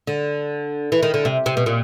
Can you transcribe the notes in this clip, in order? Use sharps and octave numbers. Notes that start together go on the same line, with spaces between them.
D3
E3
D#3
D3
C3
C3
B2
A#2